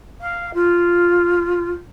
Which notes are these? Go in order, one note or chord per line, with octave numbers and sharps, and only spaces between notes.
F5
F4